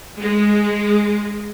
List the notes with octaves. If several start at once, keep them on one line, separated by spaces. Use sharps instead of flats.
G#3